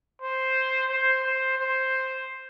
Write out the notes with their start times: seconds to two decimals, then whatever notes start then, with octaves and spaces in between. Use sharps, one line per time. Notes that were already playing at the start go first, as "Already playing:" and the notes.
0.22 C5
0.90 C5
1.24 C5
1.58 C5